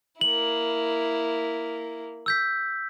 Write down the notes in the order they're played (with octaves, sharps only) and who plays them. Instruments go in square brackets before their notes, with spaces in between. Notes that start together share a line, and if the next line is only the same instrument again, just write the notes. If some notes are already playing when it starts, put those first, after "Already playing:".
[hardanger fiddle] A#3 E4 [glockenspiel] F#7
[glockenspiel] E6 G6 B6